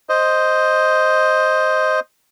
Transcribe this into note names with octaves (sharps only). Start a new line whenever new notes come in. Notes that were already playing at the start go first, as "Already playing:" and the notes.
C5 D#5